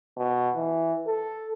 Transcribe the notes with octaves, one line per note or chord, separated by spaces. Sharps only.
B2
E3
A4